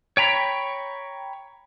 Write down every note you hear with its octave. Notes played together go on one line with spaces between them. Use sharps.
C#5 G5 A#5 B5